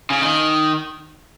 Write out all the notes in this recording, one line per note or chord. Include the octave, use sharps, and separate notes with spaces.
C#3
D#3